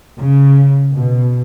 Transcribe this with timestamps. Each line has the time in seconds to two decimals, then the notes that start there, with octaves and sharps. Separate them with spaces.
0.20 C#3
0.92 B2